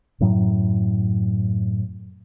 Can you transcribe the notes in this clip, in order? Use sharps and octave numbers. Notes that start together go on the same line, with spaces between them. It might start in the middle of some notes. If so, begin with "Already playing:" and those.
F#2 A2 F#3